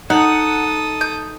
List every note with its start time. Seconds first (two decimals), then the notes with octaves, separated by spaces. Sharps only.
0.10 D#4 A4 F#5 D#6
1.01 G6